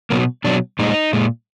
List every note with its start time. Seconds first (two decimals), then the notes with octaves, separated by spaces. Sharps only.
0.10 B2 F#3 A#3
0.44 B2 F#3 D4
0.79 A#2 G#3 D#4
1.13 A#2 G#3